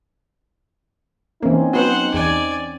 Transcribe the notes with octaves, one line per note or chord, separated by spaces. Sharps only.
E3 A#3 C4 C#4 D#4
F#3 B3 C5 F#5
E2 D5 G#5